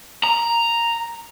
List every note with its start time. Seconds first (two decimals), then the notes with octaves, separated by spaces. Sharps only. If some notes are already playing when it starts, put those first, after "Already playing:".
0.24 A#5